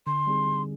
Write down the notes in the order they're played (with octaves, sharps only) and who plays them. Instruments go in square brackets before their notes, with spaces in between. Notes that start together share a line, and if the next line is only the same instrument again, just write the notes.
[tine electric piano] D3 [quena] C6
[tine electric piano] G3 C4 D#4 G#4
D3